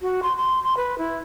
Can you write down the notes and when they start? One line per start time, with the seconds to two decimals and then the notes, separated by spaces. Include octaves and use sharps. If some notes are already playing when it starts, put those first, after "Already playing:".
0.01 F#4
0.23 C6
0.38 C6
0.63 C6
0.77 B4
0.98 E4